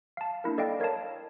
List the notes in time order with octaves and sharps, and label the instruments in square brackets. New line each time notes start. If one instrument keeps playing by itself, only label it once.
[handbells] F5 A5
A#3 D4 E4 A#4
A4 D5 D#5 F5 G5
A#4 C#5 D#5 F5 A5